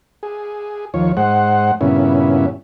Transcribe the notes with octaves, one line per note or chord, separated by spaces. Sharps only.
G#4
D#2 F3 C#5
G#2 G#3 C5 F#5
G2 A#2 C#3 B3 C#4 E4